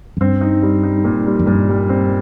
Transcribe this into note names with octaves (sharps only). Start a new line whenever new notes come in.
F2
G2 C4
D#4
G3
D#4
A#2
G3
F2
G2 A#2
G3
C4